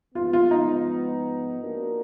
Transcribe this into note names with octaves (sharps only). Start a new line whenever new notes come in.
G#2 F3 G#3 B3 F4
F4
D#4
F3 A#3 D4 F#4 A#4